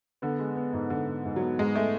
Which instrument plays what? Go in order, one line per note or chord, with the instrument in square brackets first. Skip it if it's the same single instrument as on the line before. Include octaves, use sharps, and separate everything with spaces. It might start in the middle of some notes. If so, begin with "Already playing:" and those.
[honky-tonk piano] D3 [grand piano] B3
[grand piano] G#3
B3
G#2
[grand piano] G#2 [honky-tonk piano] D3
[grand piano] G#2
G#2
[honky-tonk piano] F#3
[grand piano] B3
[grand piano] G#2 [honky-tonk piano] G#3
[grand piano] G#3 [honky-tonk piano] A3